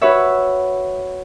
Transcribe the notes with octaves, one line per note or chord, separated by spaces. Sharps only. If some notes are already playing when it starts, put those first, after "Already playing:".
F#4 B4 C#5 E5